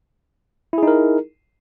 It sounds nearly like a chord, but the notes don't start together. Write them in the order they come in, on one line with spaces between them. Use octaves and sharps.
E4 G#4 D#4 A#4